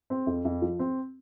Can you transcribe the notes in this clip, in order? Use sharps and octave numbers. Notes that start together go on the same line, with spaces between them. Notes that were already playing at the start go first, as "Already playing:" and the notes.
C4
F2
F2
F3
C4